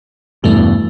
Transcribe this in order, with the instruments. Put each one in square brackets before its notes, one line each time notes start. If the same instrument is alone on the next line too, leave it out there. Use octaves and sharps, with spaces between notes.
[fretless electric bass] E2 G2 B2 [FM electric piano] E3 A3